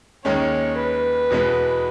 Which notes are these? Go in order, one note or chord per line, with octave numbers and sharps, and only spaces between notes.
D#2 D#3 G#3 C#4 C#5
B4
E2 B2 G#3 B3